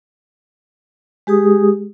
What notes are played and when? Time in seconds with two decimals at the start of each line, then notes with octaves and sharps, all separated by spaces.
1.27 G#3 G4 G#4 D#6